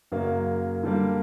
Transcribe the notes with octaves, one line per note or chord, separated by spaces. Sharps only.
F#2 C#3 F#3 A#3
D3 G3 A#3